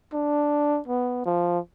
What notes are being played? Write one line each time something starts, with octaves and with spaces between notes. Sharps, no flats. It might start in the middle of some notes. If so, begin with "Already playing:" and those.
D4
B3
F3